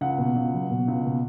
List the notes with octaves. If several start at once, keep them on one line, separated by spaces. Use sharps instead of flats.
C#2 F#5
B2
C#2
F#3
B2
C#2
B2